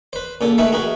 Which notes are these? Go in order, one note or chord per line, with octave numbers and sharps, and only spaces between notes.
B4 C5
A#2 C#3 A4
A3 D#4 E4 G#4 B4
F#4 G#4 A#4 B4